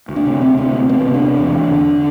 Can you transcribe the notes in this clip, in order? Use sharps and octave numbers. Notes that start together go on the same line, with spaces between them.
D2
D4
C3
C3 C4
D2 C4
D2
C3 B3
C3
D4
D2
E2
D3
D3